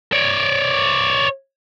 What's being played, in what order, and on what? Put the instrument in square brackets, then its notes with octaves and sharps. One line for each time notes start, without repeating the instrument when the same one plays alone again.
[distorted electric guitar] C#5 D5